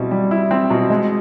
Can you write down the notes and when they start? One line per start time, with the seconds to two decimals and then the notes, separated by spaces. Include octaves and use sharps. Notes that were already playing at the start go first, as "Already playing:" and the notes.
Already playing: B2 G3 C4 E4
0.11 G3
0.31 E4
0.51 C4
0.70 B2
0.90 G#3